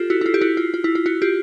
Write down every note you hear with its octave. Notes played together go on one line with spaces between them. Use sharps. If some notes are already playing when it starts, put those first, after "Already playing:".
Already playing: F4 G4 A4
E4 F#4
E4
F4
G4
E4 F#4
F4
F4
E4
F4
E4 F#4
F4 G4